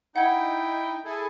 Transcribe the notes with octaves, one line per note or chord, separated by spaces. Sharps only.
D#4 E4 F#5 G5 G#6
E4 G#4 A4